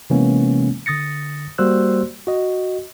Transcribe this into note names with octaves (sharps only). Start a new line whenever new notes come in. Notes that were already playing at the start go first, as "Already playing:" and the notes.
C3 E3 G#3 A#3 B3 C#4
D3 D#6 A6 A#6 C#7
G3 A#3 F#4 C5 E6 F#6
F#4 D#5